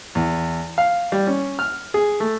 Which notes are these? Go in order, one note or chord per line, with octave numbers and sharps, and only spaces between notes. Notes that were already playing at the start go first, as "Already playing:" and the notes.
E2
F5
G3
C#4
F6
G#4
A3